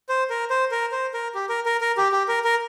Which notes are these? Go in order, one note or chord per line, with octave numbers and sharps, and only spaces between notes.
C5
A#4
C5
A#4
C5
A#4
G4
A#4
A#4
A#4
G4
G4
A#4
A#4